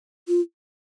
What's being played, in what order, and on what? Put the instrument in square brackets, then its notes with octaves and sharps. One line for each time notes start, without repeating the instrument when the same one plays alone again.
[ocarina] F4